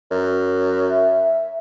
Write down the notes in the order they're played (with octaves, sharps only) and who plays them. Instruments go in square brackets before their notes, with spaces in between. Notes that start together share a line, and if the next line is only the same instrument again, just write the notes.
[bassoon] F#2
[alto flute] E5